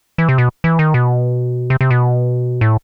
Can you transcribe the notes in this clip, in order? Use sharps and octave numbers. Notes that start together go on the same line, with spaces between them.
E3
C3
B2
E3
D#3
B2
C3
C3
B2
A2